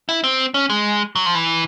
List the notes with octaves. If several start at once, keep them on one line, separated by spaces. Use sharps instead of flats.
E4
C4
C#4
G#3
F#3
F3
E3